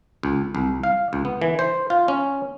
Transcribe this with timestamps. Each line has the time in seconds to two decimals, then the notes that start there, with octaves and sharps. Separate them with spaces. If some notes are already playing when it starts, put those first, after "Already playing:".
0.23 C#2
0.55 C2
0.83 F5
1.13 C#2
1.25 B3
1.42 E3
1.59 C5
1.90 F4
2.08 C#4